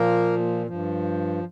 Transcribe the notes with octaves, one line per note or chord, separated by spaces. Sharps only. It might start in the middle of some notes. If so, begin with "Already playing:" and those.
Already playing: A#2 F3 A#3 A#4
G2 F3